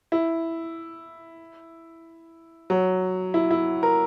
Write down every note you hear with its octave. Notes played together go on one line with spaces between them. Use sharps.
E4
F#3
E4
E4
A#4